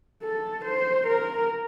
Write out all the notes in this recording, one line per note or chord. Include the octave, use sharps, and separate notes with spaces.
A4
C5
A#4